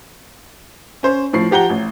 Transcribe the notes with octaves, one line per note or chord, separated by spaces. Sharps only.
C#4 C5 C6
A2 F3 C7
F3 G4 F#5 A#5 G7
A1